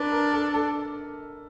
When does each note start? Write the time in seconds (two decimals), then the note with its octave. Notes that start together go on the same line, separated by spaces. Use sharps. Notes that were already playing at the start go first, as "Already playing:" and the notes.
Already playing: D4 A#4 B4
0.12 A#4
0.33 A4
0.54 A4